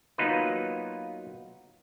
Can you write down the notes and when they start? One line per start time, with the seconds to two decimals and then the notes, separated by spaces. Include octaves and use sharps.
0.18 F#3 A#3 B3 D#4 F4 B4